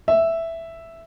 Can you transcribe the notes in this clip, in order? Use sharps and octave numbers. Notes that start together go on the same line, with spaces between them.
E5